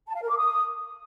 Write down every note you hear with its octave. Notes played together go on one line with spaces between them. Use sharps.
A5
F5
A#4
D6
D#6